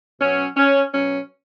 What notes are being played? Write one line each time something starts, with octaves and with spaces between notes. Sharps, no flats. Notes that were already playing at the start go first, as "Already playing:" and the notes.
B2 F#3 C#4
C#4
B2 F#3 C#4